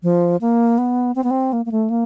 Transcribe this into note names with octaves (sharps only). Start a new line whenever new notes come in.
F3
A#3
B3
C4
B3
C4
A#3
A#3
A3
A#3